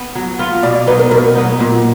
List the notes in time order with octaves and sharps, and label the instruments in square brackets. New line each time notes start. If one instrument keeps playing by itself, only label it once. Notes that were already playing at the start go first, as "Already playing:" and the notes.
Already playing: [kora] B3
F#3
B3 F4
[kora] B2 [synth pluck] D5
[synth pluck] D5
[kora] F#3 B3 D#4 [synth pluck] B4
[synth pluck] A#4
[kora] B2 [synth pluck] A#4
[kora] F#3 B3 D#4
A#2